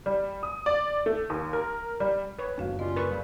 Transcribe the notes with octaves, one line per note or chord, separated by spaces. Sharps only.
G3
D#6
D5
A3
D#2
A#4
G3
B4 C#5
F#1 F#2 A3 D4 F#4 F5
G3 C#4 F4 D#5
A#4 B4 C#6
C#3 F#3 G3